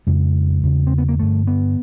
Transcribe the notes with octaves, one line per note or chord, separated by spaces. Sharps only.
F2 C#3 G#3
E2 C#3
C4
B3
A#3
G2 D3 A3
B3